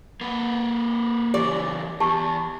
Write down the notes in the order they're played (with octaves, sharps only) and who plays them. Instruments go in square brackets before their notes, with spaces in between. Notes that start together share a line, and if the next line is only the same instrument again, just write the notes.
[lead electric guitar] A#3 B4
[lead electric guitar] C#3 E3 [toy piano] G4 [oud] D5
[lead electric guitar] E2 [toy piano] G4 A5 C#6